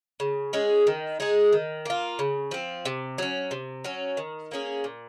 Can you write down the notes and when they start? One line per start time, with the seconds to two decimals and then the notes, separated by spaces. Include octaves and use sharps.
0.20 C#3
0.53 G#3 C#4 G#4
0.87 D#3
1.20 G#3 D#4 G#4
1.52 D#3
1.85 A#3 F4
2.19 C#3
2.51 F3 C4
2.85 C3
3.18 F#3 C#4
3.51 C3
3.84 F#3 C#4
4.17 D#3
4.51 A#3 C#4 G#4
4.84 A#2